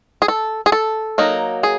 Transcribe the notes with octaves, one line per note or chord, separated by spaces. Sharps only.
G#4
A4
G#4
A4
F#3 A#3 D#4
G#4